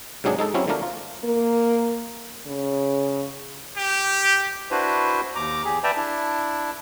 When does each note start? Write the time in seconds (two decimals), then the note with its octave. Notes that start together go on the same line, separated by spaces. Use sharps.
0.24 G#2 C3 F#3 D4 G#4
0.39 G#3 D#4 A4
0.54 F#3 C4 C#4 E4
0.68 D3 F3 A3 D4 A#4
0.83 F4
1.24 A#3
2.46 C#3
3.76 G4
4.71 D4 E4 F#4 B4 C5
5.35 D#2 A#5 D6
5.65 E2 G4 G#4
5.84 B4 D5 E5 G5 A5 A#5
5.96 D4 E4